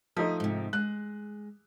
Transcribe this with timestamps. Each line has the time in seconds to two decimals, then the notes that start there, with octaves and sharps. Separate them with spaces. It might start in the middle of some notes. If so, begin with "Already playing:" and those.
0.16 F3 A3 D#4 D#5
0.40 G#2 C3
0.73 G#3 F#6